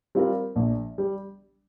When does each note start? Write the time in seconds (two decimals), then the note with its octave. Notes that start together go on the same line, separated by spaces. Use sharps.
0.15 G3 C4 F4 A#4
0.56 A#1
0.98 G3